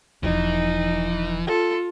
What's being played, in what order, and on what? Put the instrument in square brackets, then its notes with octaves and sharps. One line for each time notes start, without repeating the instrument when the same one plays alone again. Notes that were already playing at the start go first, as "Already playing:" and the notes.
[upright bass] E1 F3 [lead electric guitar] E3 [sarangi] D#4
[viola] F4 [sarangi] A4